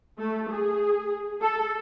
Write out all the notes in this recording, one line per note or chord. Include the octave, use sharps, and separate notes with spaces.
A3
G#4
A4